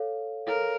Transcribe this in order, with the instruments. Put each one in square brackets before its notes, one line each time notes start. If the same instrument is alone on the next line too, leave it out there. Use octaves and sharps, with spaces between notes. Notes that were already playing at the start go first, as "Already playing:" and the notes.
Already playing: [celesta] A4 C#5 F5
[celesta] A4 C#5 F5 [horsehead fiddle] A#4